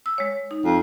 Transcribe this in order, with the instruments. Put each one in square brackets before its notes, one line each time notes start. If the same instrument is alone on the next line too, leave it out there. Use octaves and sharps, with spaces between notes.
[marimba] E6
G#3 C#5
D#4
[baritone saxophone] F2